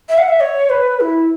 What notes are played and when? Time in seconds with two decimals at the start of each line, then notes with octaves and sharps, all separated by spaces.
0.09 E5
0.18 F#5
0.28 E5
0.40 C#5
0.70 B4
1.01 E4